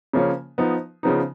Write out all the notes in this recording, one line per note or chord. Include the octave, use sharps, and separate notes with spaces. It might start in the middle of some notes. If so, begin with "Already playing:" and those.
C#3 F3 A#3 C#4
F3 B3 D#4
C#3 F3 B3 D#4